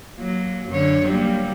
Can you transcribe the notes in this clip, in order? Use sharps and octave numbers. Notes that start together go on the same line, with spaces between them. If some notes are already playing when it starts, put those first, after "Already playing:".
F#3 A#3
F#2 D3 C#5
F#3 G3 A#3